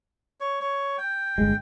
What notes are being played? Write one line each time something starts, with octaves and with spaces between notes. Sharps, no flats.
C#5
C#5
G5
G1 G#3